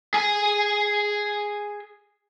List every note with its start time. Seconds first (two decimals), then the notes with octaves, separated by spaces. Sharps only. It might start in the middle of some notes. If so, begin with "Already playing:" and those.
0.14 G#4 G#5